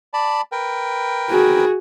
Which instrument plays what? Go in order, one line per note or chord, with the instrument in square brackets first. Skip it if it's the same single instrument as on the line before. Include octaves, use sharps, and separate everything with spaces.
[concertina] D5 A5 B5
A#4 B4 G5
[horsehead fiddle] F#4 G#4